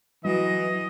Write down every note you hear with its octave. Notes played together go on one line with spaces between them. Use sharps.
E3 F#3 D#5